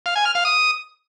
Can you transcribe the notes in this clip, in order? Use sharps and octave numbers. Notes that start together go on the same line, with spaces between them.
F5
G#5
F6
F5
D#6